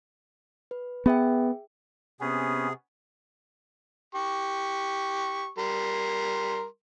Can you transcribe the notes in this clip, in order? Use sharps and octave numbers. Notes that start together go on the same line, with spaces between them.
B4
B3 G#4 E5 G5
C3 B3 C#4 G#4
G4 C#6
G3 A#4 C6